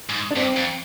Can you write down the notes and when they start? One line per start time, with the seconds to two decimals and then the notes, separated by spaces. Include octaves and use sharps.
0.09 G#2
0.31 D4
0.36 G2 C4
0.56 F2